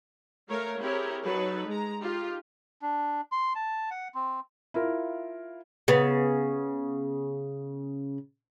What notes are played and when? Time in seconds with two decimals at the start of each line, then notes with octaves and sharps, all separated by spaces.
0.49 A3 A#4 C#5 F5 A#5
0.80 C4 E4 G4 G#4 A#4 C#5
1.24 F#3 D#4 A4 B4
1.68 G#3 A#5
1.99 D#4 F4 G4
2.82 D4
3.32 C6
3.55 A5
3.91 F#5
4.15 C4
4.74 E4 F4 A#4 F5
5.88 C#3 B3